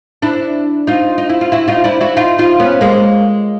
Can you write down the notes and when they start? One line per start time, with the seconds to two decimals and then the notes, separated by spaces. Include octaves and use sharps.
0.22 D4 E4
0.87 D#4 F4
1.18 D#4
1.29 E4
1.41 F4
1.52 E4 F#4
1.68 D#4 F4
1.84 D4 E4
2.01 E4 F#4
2.17 D#4 F4
2.38 D#4 F4
2.60 B3 C#4
2.81 G#3 A#3